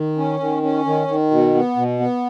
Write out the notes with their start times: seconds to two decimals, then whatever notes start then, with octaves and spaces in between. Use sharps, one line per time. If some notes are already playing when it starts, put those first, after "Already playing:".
Already playing: D#3
0.17 C#4
0.40 D#3
0.63 C#4
0.85 D#3
1.08 D#3
1.31 B2
1.55 B3
1.76 B2
1.99 B3